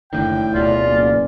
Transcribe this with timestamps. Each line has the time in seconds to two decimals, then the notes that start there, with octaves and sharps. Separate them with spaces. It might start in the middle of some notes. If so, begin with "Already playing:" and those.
0.13 F#1 A2 D3 D#3 G5
0.53 D1 B2 F4 G#4 B4 D5
0.87 F#1